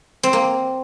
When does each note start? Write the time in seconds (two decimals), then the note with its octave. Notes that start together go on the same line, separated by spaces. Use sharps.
0.23 C4
0.33 A#3